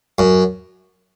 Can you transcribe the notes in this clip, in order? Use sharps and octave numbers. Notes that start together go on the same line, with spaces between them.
F#2